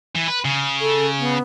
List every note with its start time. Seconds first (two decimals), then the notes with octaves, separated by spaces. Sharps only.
0.15 E3
0.28 B4
0.45 C#3
0.81 A4
1.19 B3